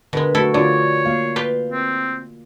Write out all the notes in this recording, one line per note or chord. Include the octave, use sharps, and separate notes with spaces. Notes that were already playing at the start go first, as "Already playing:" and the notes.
B2 D3 G#3 A#4 B4
A3 E4 F#4 A4
D3 F4 F#4 C#5 D5
A#3 F5
F4 G4 B4
C4